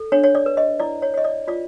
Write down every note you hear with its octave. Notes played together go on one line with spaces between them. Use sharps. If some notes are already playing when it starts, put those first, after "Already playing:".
Already playing: A4
D4 C#5
C#5
D5
B4
D#5
E4 D5
C#5
C#5 D#5
D5
F4 D5